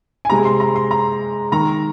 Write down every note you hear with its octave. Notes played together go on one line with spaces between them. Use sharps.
G#5
C3 G#3 A#5
C6
A#5
C6
A#5
D#3 G#3 A#5